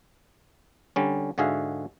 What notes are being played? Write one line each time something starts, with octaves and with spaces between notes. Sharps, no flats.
D3 G3 C#4
G#2 D3 F#4 G#4 E5 F5